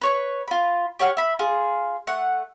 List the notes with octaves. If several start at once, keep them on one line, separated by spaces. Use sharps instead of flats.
B4 C#5 C#6
F4 B5
G4 C#5 F#5 F6
E5 B5
F4 G#4
A3 F#5